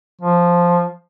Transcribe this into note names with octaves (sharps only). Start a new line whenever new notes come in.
F3